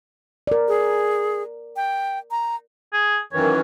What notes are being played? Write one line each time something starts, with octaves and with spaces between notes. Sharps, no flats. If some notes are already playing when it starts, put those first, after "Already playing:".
A#4 D5
G#4
G5
A#5
G#4
F#2 D#3 E3 C#5